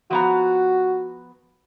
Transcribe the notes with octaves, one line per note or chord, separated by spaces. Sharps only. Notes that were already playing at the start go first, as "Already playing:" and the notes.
F3 B3 F#4 A#5